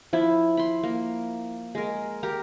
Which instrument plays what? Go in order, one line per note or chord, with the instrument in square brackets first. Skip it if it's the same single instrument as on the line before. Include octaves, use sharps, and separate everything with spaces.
[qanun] F3 E4
B5 C6
A#3
G#3 A#4
G4 A#4 A#5